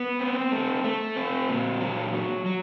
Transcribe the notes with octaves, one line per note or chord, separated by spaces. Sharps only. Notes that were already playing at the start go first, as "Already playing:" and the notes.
Already playing: B3
C4
A3
A3
C4
A#2
F#3
F#3
F#3